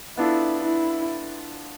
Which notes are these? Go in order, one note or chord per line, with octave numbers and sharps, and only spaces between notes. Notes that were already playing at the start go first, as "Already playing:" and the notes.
B3 D4 E4 F4 A4
E4